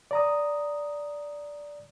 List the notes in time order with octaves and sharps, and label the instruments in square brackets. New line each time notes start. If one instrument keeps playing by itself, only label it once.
[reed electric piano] D5 A#5 D#6